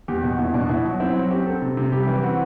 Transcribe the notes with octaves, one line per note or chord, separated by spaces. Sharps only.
E2 G4
B2 F#4
E2 E4
B2 D4
B2 E4
F#3 F#4
C4 E4
F#3 F#4
C4 G4
C4 A4
C3
C3
G3 G4
E3 E4
C4 F#4